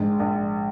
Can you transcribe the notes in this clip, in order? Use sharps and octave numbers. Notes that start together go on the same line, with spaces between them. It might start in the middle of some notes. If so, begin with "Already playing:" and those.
Already playing: A#1 G#2 G#3
A#1